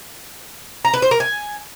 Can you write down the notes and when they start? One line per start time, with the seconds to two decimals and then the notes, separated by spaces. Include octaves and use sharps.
0.85 A#5
0.93 B4
1.02 C5
1.11 A#4
1.20 G#5